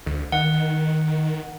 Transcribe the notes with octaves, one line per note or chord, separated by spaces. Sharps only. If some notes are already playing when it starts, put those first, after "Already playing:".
D2
D#3 F#5